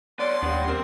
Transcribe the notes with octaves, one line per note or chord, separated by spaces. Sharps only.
B3 C#5 D5 C6
D#2 B3 D4 G4
C4 A#4